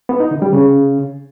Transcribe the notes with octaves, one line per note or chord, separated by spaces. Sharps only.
B3
D#4
D3
G3
C#3